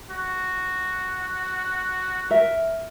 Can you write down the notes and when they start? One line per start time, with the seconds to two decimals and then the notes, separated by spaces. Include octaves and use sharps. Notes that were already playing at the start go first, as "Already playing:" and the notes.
0.10 F#4
2.30 A#4 E5